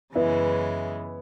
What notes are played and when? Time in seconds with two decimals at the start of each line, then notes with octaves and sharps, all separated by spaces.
0.15 F#2 C#3 E3 G#3 B3 E4